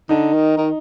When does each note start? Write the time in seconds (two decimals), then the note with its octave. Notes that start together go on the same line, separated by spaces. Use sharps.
0.09 D3 D#4
0.34 D#3
0.58 D#3